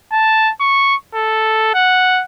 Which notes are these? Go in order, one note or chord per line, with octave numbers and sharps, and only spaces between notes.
A5
C#6
A4
F#5